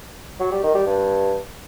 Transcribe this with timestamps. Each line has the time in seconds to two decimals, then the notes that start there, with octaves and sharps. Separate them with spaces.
0.40 F#3
0.51 G3
0.63 D#3
0.75 G3
0.86 G2